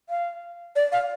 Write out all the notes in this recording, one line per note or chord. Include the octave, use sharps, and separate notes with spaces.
F5
D5
F5